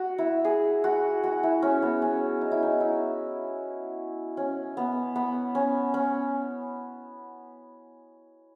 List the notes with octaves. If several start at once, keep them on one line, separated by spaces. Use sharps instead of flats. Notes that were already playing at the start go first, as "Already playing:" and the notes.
Already playing: F#4
E4
G#4
F#4
F#4
E4
C#4
B3
C#4
D#4
E4
D#4
E4
C#4
B3
B3
C#4
C#4